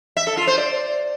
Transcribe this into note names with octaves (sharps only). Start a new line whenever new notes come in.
E5
A4
F4
C5
D5